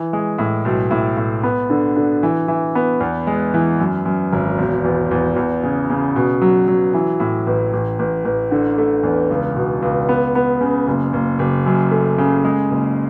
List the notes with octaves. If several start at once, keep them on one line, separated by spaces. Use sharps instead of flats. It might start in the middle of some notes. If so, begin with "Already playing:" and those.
Already playing: E3
G#3
A2
B1
A2
A2
B3
D3
D3
E3
E3
B3
E2
G#3
E3
F#2
F#2
G#1
E1
E2
E2
E2
C#3
C#3
B2
F#3
F#3
E3
A2
A1
A1
A1
A1
D3
A3
E2
C#2
B2
C#2
B3
B3
C#3
F#1
F#1
F#1
F#2
A3
C#3
G#3
F#1